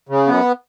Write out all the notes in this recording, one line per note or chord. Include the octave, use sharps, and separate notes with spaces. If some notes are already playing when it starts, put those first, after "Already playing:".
C#3
F#2 B3